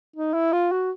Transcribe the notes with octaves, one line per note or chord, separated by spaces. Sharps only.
D#4
E4
F4
F#4